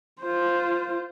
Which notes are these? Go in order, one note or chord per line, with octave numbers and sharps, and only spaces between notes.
F4 C5